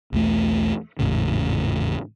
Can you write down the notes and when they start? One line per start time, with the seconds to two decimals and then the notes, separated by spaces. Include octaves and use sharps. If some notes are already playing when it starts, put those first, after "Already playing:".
0.12 B1 E2 A3
0.99 G#1 E2 A2 C#3